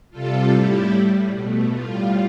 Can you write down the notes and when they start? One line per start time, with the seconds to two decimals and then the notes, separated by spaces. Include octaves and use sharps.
0.11 C3 G3 F4 A4
0.51 A2 G3 E4 G4
0.91 A2 G3
1.31 B2 A3
1.71 A2 G3 F4